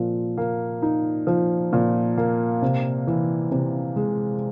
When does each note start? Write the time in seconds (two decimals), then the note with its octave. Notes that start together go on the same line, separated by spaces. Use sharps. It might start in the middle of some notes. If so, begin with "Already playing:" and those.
Already playing: A#2 F3
0.38 A#3
0.82 D#4
1.27 F3
1.73 A#2
2.18 A#3
2.62 C3
3.07 E3
3.51 C3
3.96 G#3